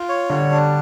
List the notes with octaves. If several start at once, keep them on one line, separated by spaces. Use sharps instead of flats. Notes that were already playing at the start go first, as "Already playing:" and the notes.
Already playing: F4
C#5
D3 G3
D4